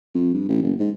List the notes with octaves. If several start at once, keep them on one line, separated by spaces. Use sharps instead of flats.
F2
G2
A1
F#1
G#2